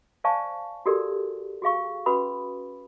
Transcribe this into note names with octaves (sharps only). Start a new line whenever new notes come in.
C5 D5 F5 G#5 A5 C#6
F#4 G4 A4 A#4 D5
F#4 G#4 F5 C#6
C#4 F#4 B4 B5 D#6